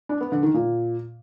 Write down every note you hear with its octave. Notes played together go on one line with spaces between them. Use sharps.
D4
B3
D3
D#3
A#2